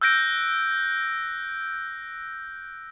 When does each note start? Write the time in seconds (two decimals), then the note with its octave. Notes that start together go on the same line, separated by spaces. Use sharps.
0.01 E6 F#6 G6 A#6 D7